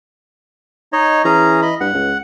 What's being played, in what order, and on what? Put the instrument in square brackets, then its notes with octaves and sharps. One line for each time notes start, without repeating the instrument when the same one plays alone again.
[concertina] D#4 C#5 D#5
[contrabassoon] E3 [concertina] C#4 G#4 A#5
[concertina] D#5 B5
[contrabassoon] G2 [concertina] F#5
[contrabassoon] C#2